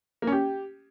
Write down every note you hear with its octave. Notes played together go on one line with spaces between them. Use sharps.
A#3
C#4
G4